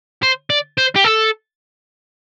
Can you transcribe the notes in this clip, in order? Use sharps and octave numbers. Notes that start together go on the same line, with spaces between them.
C5
D5
C5
G4
A4